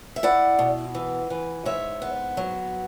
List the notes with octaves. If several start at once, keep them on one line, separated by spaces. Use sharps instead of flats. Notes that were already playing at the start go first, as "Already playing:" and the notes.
E5
E4 D5 F#5
B2
E3
E3
G#2 C#5 E5
B3
F#3